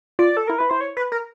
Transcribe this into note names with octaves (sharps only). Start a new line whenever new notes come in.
F4 D5
A4
E4 A#4
E4 B4
E4 C5
C#5
B4
A#4